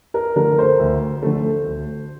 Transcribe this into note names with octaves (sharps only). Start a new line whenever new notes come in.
A#4
D3 A3 A#4
C5
D2
D3 A3
D2